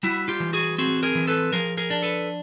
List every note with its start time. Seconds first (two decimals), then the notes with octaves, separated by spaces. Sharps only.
0.03 G3 E4 F#4
0.28 F4 G4
0.40 E3
0.53 F#4 G#4
0.78 C4 F#4 G#4
1.03 G#4 A#4
1.15 E3
1.27 A4 B4
1.52 F3 G#4 A#4
1.77 G#4 A#4
1.90 D4
2.03 A4 B4